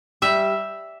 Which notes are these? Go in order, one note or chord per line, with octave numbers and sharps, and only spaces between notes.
G3 E5